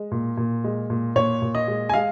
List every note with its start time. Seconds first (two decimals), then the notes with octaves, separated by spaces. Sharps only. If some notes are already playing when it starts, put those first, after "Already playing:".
Already playing: G#3
0.12 A#2
0.37 A#2
0.64 G#3
0.90 A#2
1.15 A#2 C#5
1.42 A#2
1.55 D#5
1.68 G#3
1.89 G#5
1.94 G#3 F5